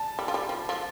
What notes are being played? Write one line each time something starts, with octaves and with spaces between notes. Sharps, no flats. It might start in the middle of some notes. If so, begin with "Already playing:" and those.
Already playing: A5
G3
F3
G3
F3
F3